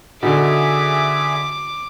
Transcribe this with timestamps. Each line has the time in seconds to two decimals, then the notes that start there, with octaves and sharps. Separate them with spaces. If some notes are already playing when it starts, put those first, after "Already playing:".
0.23 B2 D3 D#4 G#4 E5 D6